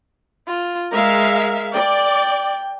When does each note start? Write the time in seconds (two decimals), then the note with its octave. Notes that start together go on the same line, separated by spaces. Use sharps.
0.48 F4
0.92 G#3 A#4 E5 F5
1.74 D5 G5